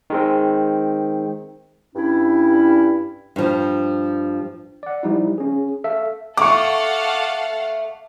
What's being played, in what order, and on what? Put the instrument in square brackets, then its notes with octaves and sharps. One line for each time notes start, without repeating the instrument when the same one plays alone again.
[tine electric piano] D#3 G#3 C4
[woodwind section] G2 C#4 E4
[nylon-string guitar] G2 F3
[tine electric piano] D5 F#5
F3 G3 D#4 E4
C#4 G#4
A4 E5 F5
[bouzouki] A3 [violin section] A4 F5 F#5 [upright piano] C#6 D6